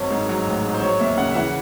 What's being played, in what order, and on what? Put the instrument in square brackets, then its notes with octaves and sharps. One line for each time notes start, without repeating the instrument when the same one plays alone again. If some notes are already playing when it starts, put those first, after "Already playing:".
Already playing: [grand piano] G#1 F#3 C#5
G#2
F#3
A1
G#2
C5
F#3 C#5
D#2 E5
C#3 F#5
E5
E3 F#5